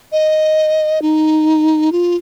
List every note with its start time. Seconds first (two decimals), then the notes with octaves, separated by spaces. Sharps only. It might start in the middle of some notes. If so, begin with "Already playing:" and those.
0.12 D#5
1.02 D#4
1.92 F4